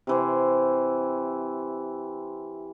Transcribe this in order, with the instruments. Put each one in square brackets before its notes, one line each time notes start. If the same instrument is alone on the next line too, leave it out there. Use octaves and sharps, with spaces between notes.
[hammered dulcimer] C3 E3 C5